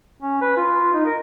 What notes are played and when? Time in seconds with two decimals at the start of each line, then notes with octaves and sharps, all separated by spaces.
0.22 C#4
0.41 B4
0.57 F4
0.93 D#4
1.06 A#4